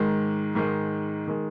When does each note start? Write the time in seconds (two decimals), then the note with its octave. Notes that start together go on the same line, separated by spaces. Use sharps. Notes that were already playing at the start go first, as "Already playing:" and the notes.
Already playing: G#2 D#3 G#3
0.55 G#2 D#3 G#3
1.28 D#3 G#3